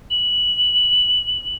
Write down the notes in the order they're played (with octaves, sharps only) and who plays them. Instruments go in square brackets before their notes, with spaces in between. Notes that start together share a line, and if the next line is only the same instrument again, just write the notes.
[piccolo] F#7